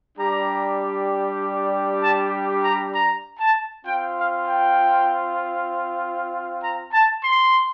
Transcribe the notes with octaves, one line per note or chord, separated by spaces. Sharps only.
G3 D4 G4 A#5
A5
A#5
A#5
A5
C4 F4 G5
F5
G5
A#5
A5
C6